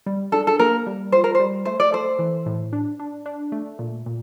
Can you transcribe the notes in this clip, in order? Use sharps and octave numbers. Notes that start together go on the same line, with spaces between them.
G3
D4 A4
A4
A#3 A#4
G3
F4 C5
A#4
C5
G3
A3 C5
D5
A4 C5
E3
A2
D4
D4
D4
A3
A#2
A#2